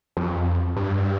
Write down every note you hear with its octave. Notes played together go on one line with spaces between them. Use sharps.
F2
G2